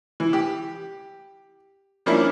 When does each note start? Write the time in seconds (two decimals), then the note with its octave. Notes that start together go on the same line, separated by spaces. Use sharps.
0.20 E3
0.33 G4
2.06 F3 G3 A#3 C#4 D4 E4